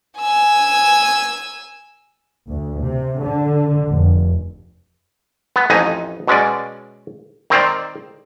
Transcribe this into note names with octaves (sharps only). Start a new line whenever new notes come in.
G#5 E6
D2
C3
D3
F1
B3
A1 F2 D#4 D#5 G#5
B2 G#3 C#4 D5
D#3 C4 A#4 C5 D5